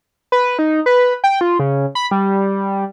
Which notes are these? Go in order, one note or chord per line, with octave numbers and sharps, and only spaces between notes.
B4
D#4
B4
G5
F4
C#3
B5
G3